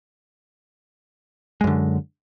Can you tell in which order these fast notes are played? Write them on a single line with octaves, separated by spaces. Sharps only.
G#3 F#2 D3